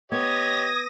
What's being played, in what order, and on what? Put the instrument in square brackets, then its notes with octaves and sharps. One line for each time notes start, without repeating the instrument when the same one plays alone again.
[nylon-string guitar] B3 [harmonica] G4 C#5 D#5 [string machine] D#6 A#6 [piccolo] G#6